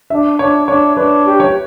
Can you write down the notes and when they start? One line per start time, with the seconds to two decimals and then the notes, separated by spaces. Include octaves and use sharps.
0.10 D4 E5
0.39 D4 C#5
0.68 D4 C#5
0.97 D4 B4
1.25 G4
1.40 C#5